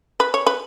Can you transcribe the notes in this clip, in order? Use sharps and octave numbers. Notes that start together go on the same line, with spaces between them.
B4
C#5
B4